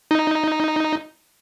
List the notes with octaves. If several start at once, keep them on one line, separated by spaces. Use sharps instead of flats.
D#4